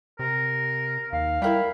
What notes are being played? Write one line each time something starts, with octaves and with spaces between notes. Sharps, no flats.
C3 A#4
D#2 F5
G3 E4 A#4 G5 B5